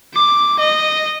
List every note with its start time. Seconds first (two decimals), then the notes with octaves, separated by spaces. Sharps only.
0.14 D6
0.59 D#5